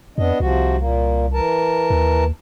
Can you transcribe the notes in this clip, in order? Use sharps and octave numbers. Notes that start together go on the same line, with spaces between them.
F2 B3 D4 D#5
C2 C3 F3 F#4
A#2 A#3
E3 A#4 A5
D#2